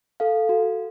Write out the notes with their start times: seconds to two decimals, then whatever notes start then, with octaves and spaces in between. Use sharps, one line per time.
0.20 A4 F5
0.49 F#4